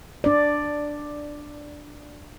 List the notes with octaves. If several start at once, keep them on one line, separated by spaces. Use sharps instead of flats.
D4 D5